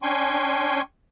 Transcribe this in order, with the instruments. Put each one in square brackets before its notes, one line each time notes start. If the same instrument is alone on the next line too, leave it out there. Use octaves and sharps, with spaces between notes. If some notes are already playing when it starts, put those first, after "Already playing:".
[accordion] C#4 D4 G5 G#5 C6 C#6